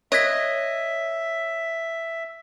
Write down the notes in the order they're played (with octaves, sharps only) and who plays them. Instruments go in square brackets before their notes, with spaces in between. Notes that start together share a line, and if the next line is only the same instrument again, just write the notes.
[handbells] C#5 G#6 B6 [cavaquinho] D#5 [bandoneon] E5